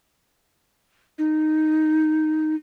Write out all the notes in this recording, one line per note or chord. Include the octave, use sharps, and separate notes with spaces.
D#4